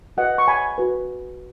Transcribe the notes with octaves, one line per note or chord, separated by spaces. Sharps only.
F#4 B4 D#5 F#5
C#6
G#5 B5
F#4 B4